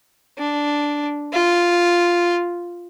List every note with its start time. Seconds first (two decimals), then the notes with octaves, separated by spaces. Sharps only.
0.38 D4
1.33 F4